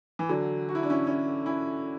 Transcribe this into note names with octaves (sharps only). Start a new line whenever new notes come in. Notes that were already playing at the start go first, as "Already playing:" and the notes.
E3
D3 F#3
F#4
E4
D4
C#4 E4
C#4 E4
C#4 E4